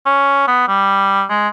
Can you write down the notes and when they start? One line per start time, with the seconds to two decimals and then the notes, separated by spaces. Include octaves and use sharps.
0.06 C#4
0.48 B3
0.68 G3
1.29 G#3